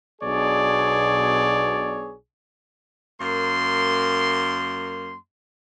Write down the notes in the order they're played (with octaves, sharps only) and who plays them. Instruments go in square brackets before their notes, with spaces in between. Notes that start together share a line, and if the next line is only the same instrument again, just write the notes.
[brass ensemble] B1 B2 D4 G#4 C#5 D5
[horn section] F#2 A#3 C6